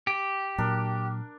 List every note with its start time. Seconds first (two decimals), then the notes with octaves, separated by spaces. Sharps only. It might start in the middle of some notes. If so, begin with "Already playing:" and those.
0.07 G4
0.58 A#2 F#3 D4 A#4